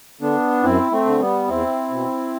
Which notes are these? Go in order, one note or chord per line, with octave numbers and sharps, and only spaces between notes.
D3 B3 D4
F#2 C4 E4
A3 C4
D3
G3 B3
E2 C4 E4
B2